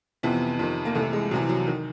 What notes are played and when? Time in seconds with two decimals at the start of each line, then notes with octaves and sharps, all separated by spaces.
0.23 F2 C3 E3 B3
0.59 F2 C3 D#3
0.85 A#3
0.95 C2 C3 E3 A3
1.13 G#3
1.31 C2 C3 E3 F#3
1.49 F#3
1.67 D#3